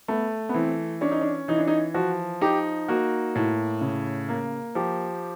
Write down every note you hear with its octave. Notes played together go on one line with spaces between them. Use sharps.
A3 B3
B3
E3 C4
C#4 D4
D#4
D4
E3 D#4
D4
D#4
F3 F#4
D#4 G4
A#3 F#4
A2
C#3
A#3
F3 G4